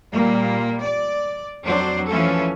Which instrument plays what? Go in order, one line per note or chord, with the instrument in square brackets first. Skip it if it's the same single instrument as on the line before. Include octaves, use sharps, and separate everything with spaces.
[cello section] A#2 G3 A#3
D5
F2 F#3 D4 C5
E3 F3 A3 C#4 A4